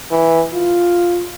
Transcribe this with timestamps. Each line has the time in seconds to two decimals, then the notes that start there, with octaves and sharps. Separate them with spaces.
0.11 E3
0.53 F4